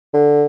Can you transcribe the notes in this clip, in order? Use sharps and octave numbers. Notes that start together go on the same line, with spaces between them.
D3